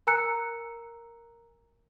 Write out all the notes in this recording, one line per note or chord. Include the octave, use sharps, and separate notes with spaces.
A#4 G#5 A#5 E6 F#6 C#7